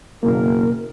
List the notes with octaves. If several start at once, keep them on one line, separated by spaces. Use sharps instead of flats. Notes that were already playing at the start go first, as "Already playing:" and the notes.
F#1 D#2 B2 A#3 A#4